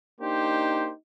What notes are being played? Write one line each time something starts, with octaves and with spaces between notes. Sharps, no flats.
A#3 D4 D#4 G4 C5